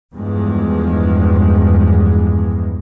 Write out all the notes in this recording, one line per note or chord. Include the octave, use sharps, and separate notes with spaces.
E2 G2 F3 G#3